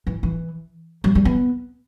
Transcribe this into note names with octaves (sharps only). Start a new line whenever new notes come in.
E3
E3
F#3
G3
B3